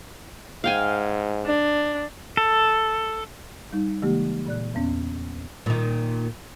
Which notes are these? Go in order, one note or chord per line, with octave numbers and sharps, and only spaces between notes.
G#2 F5 G5 G#5
D4
A4
G3 D#4
C#3 E3 G#3 A#3 G4
A#2 D5 F#6
E2 B3 C#4
A#2 D#3